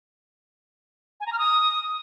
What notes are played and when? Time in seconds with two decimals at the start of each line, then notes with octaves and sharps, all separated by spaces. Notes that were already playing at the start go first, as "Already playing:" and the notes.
1.20 G#5
1.26 A#5
1.32 F6
1.38 D#6